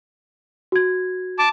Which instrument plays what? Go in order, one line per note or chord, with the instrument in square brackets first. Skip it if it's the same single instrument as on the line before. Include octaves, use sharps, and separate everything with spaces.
[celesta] F#4 G#6
[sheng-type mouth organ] A5 D6